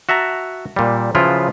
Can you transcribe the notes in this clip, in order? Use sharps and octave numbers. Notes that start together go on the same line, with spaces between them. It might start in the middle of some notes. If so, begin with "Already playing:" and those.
F#4 E5 A5 A#5
A#2 G3
C#3 F3 F#3 E4 F4 B4